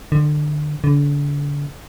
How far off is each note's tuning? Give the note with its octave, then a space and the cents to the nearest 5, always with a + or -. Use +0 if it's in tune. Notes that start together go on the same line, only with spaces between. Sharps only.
D3 +25
D3 -35